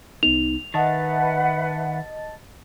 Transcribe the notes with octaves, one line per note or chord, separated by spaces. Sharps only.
C2 B3 D#4 F7
D#3 B4 D#5 E5 F#5 A5 A6